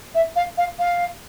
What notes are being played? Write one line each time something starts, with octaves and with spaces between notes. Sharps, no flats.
E5
F5
F5
F5